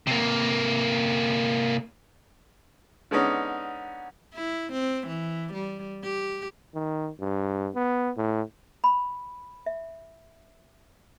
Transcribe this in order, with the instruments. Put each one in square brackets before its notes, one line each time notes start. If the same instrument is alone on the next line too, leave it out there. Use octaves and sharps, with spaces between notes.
[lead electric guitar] C3 A#3
[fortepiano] D3 G#3 B3 C#4 D#4
[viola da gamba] E4
C4
E3
G3
G4
[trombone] D#3
G2
B3
A2
[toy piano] B5
E5